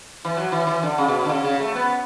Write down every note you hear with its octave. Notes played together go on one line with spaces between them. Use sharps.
E3
F#3
E3
E3
D3
C#3
B2
B2
D3
C#3
C#3
A3
B3